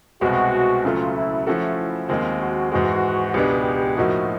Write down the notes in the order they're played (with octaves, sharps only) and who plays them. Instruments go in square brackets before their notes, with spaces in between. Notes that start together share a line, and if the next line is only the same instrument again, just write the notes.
[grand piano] C2 B2 G#3 C4 [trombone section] F#4
[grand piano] D2 C#3 F#3 A3 [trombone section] F4
[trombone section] E4
[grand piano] F3 A3 C#4 F#4 A4 [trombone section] E4
[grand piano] D#2 D#3 G#3 C4 [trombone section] F4
[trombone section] F#4
[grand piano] G#2 E3 G#3 [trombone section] F#4
[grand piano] C#2 B2 G#3 B3 D4 [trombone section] G4
[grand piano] A2 F3 A#3 D#4 [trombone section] F#4